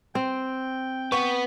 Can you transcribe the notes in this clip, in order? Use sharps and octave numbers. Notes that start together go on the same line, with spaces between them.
C4 G5
B4 F#5 C#6